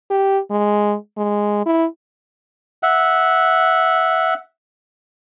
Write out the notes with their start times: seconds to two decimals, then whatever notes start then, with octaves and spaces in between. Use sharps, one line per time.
0.10 G4
0.51 G#3
1.18 G#3
1.66 E4
2.83 E5 F#5